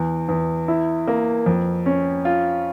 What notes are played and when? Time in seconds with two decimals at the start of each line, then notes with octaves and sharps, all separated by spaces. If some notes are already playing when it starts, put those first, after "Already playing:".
Already playing: E2
0.29 E2
0.68 E4
1.07 A#3
1.46 F2
1.86 C#4
2.25 F4